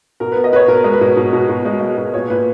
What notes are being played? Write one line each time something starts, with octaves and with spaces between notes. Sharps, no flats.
B2 A#4
B3 B4
D#5
B3 B4 C#5
B2 A#4
G#3
B4
B2
B2
B2
B2
G#3
G#3
B2
A#2 C#5
A#2 B4